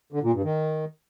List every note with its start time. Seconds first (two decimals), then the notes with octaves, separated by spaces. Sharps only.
0.13 D3
0.23 A#2
0.34 G2
0.44 D#3